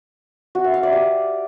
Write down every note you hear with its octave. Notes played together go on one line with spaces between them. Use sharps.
F#4
E5
F5
D5
G4